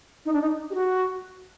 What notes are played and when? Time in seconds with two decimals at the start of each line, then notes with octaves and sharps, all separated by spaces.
0.25 D#4
0.33 D4
0.41 D#4
0.70 G4
0.75 F#4